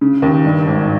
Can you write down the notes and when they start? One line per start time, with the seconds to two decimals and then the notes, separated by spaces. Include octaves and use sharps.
0.01 C#3
0.22 D#2
0.45 G2
0.67 G#1